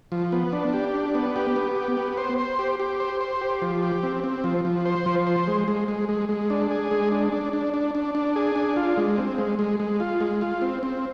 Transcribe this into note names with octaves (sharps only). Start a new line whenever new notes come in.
F3
B3
D4
G4
D4
B3
G4
B3
G4
B3
C5
C5
G4
G4
C5
C5
G4
F3
G4
C4
C4
F3
F3
C5
F3
C5
G#3
G#3
G#3
G#3
G#3
D4
G#4
G#3
D4
D4
D4
D4
D4
D4
G#4
D4
F4
G#3
C4
G#3
G#3
G#3
F4
G#3
F4
C4
C4